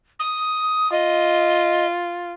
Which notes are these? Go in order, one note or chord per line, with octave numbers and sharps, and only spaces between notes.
D#6
F4 D#5